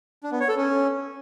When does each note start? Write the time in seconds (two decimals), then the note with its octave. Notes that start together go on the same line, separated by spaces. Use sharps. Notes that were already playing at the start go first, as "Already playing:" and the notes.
0.23 D4
0.32 B3
0.40 C#5
0.49 A4
0.57 C#4